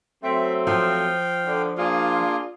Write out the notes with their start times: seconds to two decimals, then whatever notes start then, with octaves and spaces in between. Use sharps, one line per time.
0.24 F#3 A3 C4 E5
0.67 F3 F5 G5
1.46 D3
1.78 A#3 D4 F4 G#4